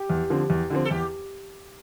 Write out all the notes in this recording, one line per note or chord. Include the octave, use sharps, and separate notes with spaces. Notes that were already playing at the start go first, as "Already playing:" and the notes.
Already playing: G4
E2
D3 F3 C4
E2
D3 F3 C4
A4
E2 G4